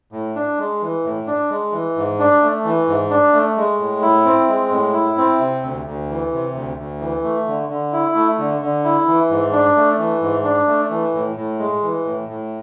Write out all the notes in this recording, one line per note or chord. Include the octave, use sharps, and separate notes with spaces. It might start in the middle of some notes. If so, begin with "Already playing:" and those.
A2
D4
G#3
E3
A2
D4
G#3
E3
G#2
D4
A3
E3
G#2
D4
A3
G#3
A2
E4
C4
G#3
A2
E4
C4
C3
D2
D2
E3
C3
D2
D2
E3
A3
D3
D3
E4
A3
D3
D3
E4
E3
G#2
D4
A3
E3
G#2
D4
A3
E3
A2
A2
G#3
E3
A2
A2